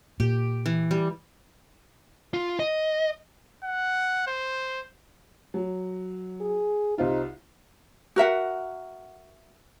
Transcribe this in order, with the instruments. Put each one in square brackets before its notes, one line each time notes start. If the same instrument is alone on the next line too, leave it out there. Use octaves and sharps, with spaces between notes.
[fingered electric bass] A#2 [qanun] G4
[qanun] E3
G3
[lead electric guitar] F4
D#5
[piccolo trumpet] F#5
C5
[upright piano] F#3
[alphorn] G#4
[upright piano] C2 C4 F4 [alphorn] D#4
[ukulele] F#4 A#4 E5 F#5